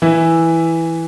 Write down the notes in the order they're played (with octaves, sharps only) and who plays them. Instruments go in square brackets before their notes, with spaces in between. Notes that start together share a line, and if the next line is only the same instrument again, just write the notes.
[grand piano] E3 E4